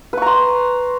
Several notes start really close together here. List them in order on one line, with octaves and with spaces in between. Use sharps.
B4 C#6 A#5 C6